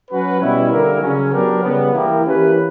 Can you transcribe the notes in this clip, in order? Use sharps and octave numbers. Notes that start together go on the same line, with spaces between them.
F#3 C#4 F#4 B4
B2 G3 C#4 E4
D3 G3 A#3 E4 A#4
C#3 F#3 C#4
F#3 B3 D4 G4 A#4
C#3 G3 B3
E3 A#3 E4 G4 A#4
E3 A#3 C#4 G4 B4